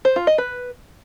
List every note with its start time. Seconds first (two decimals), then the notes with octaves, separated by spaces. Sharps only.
0.05 C5
0.16 F4
0.27 D#5
0.38 B4